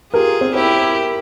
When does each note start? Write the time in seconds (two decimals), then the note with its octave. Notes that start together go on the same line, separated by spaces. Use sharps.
0.14 F4 G4 G#4 A#4
0.41 C4
0.54 C4 E4 G4